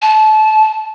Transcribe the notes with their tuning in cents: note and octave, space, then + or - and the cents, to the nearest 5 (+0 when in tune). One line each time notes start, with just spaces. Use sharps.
A5 -25